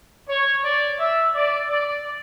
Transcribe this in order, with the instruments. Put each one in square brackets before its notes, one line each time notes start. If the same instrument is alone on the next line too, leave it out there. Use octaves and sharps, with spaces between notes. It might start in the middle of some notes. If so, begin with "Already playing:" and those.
[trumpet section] C#5
D5
E5
D5
D5